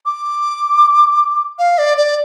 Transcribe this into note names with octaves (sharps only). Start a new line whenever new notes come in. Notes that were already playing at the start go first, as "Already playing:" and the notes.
D6
F5
D5
D5